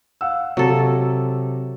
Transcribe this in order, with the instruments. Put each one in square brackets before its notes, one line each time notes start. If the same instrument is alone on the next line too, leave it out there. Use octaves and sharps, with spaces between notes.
[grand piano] F5 F#5 E6
[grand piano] C3 [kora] F#3 A4